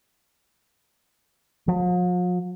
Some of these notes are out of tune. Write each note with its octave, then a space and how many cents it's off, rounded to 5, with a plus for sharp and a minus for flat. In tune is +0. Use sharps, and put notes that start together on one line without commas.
F3 +45